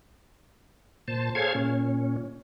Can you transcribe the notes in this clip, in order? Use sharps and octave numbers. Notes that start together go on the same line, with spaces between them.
A#2 C5 A5
G#4 A4 C5 C#5 F5 G#6
A#2 C#4